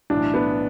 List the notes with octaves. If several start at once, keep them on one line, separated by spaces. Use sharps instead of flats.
B1 A2 E3 D4
B3